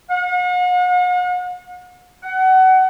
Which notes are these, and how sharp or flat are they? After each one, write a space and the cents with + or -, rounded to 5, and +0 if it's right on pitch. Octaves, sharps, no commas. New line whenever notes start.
F#5 -45
F#5 +25